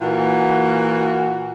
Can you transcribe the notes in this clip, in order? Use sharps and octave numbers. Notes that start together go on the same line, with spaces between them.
A#2 E3 A#3 F#4